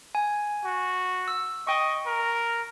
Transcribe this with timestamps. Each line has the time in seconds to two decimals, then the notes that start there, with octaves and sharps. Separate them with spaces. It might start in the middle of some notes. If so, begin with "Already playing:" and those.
0.15 G#5
0.65 F#4
1.28 E6
1.67 D#5 G5 C#6
2.06 A#4